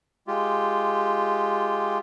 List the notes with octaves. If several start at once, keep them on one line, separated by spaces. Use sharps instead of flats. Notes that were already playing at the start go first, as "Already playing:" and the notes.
G#3 F4 G4